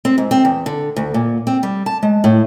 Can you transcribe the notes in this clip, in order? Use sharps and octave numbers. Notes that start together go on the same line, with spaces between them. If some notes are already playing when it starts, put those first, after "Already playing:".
C4
G#2
C4
E2
D3
D2
A#2
C4
G3
A5
G#3
A2